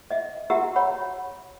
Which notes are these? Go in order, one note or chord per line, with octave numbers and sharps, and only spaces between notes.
D#5 E5
F#4 G4 E5 F#5 A#5 E6
C#5 F#5 B5